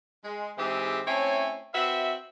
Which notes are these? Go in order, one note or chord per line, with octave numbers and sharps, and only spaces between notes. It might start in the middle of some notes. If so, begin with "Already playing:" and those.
G#3
G#2 E3 C4 G4 G#4 E5
A3 C4 C#4 E4 C#5 G#5
C4 F#4 B4 E5